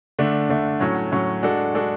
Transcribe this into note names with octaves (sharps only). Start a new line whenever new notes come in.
D3 A3 D4
D3 A3 D4
A2 F#3 C#4
A2 F#3 C#4
G#3 D4 F#4 A4
G#3 D4 F#4 A4